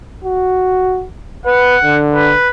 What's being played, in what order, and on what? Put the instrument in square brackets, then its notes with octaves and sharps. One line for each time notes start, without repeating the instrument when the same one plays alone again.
[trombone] F#4
[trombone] B4 [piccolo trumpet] F#5
[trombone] D3
[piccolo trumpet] B4